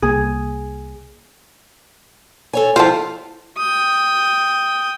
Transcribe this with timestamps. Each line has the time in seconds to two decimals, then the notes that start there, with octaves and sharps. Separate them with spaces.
0.02 C2 A#3 G#4
2.53 A4 C#5 G#5
2.76 F3 E4 F4 C5 A5
3.57 G5 D#6